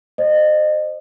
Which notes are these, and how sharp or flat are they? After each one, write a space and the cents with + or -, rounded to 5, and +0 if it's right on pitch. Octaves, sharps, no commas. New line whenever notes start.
C5 +0 D#5 -30